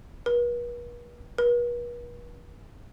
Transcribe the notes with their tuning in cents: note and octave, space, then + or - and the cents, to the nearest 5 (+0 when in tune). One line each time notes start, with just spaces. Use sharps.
B4 -45
B4 -45